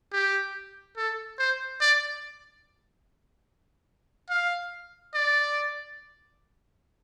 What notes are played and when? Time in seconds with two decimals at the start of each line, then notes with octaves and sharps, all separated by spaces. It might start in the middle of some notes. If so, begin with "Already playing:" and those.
0.13 G4
0.97 A4
1.39 C5
1.81 D5
4.30 F5
5.14 D5